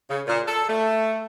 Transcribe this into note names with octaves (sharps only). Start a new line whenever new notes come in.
C#3
A#2
A4
A3